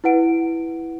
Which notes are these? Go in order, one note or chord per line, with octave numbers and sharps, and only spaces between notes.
E4 B4 F#5 D7